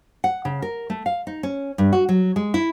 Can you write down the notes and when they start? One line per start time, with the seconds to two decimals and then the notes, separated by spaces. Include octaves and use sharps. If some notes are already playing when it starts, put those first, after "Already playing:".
0.24 F#5
0.45 C#3
0.62 A#4
0.90 A3
1.06 F5
1.27 D#4
1.43 C#4
1.78 G2
1.93 F#4
2.09 F#3
2.36 G#3
2.54 E4